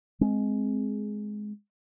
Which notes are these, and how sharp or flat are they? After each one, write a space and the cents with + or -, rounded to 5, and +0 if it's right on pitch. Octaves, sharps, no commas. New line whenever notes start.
G#3 +10 C4 +0